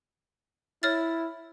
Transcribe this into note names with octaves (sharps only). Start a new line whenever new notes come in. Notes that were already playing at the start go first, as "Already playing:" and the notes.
E4 C#5 F6 A6